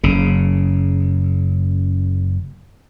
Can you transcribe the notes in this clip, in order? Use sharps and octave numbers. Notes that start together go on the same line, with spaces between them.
F#1 C#3